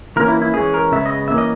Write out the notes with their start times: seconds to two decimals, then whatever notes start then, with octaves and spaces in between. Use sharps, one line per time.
0.16 E3 A#3 C#4 A#4
0.28 E4
0.42 E4
0.54 E3 G#3 C#4 G#4
0.74 A#4
0.92 C#3 G#3 B3 E5
1.06 D#5
1.28 E3 A#3 C#4 E5
1.38 D#5